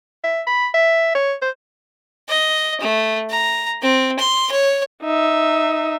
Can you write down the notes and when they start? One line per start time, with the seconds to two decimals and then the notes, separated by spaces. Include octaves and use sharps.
0.24 E5
0.47 B5
0.74 E5
1.15 C#5
1.42 C5
2.29 D#5
2.80 A3
3.30 A#5
3.82 C4
4.19 C6
4.51 C#5
5.03 D#4 E5